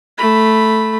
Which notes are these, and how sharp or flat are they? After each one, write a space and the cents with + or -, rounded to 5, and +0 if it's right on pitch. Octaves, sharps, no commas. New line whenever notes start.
A3 +0 B5 +0